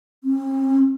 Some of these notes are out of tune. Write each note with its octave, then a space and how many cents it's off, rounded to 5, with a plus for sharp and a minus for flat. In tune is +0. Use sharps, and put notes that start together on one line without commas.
C4 +45